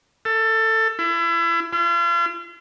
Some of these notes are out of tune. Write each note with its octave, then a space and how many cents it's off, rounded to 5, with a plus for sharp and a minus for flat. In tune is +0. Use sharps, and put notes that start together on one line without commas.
A4 +20
E4 +35
F4 -40